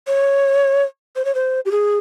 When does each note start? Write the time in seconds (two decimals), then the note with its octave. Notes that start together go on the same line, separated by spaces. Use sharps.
0.07 C#5
1.16 C5
1.25 C#5
1.35 C5
1.65 G4
1.71 G#4